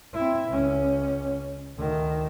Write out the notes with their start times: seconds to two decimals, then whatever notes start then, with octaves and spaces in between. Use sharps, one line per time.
0.13 C4 E4
0.48 C#2 C#4
1.77 D2 D#3